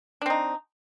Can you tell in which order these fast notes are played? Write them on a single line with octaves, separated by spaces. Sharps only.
D4 C4 D#4